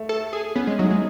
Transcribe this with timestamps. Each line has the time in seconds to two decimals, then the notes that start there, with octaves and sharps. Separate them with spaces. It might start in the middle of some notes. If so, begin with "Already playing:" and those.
Already playing: A3
0.09 A4
0.33 G#4
0.55 B3 C#4
0.67 G#3
0.78 F#3 D#4
0.90 G#3